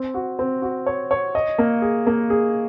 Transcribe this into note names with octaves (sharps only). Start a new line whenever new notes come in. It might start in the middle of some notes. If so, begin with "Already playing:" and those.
Already playing: C4
F#4
C4
F#4
C#5
C#5
D#5
A#3
G#4
A#3
G#4